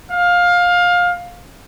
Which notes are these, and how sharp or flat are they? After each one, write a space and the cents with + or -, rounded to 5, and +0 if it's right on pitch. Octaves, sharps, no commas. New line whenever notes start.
F5 +20